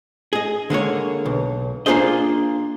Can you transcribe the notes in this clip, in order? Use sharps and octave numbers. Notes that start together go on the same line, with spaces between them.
G#4 D#5
D3 G#3 A#3 C#5
B1
A#3 D4 F4 G#4 C5 D#5